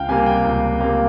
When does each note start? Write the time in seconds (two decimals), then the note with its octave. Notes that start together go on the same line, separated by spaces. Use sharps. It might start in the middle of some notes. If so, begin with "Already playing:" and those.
Already playing: C#2 F5 G5
0.09 C3 G3 A#3 G#5
0.26 G5
0.45 C#2
0.81 C3 G3 A#3